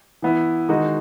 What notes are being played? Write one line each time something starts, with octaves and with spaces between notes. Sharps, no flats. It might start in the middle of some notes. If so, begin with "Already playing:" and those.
E3 B3 E4
D#3 G#3 D#4 F#4